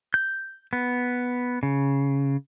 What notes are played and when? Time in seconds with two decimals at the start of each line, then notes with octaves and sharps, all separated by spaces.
0.14 G6
0.73 B3
1.63 C#3